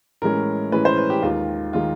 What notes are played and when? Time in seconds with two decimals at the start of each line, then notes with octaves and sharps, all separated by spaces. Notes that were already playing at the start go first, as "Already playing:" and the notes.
0.22 A2 E3 G#3 C#4 A#4
0.72 A2 E3 G#3 C#4 B4
0.85 C5
0.98 B4
1.10 G4
1.22 D#2 D#3 G#3 F4
1.73 D#3 G#3 F4